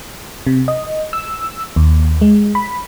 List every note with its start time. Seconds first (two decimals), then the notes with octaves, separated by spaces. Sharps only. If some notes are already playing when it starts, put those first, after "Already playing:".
0.47 C3
0.68 D#5
1.13 E6
1.76 D#2
2.21 G#3
2.55 B5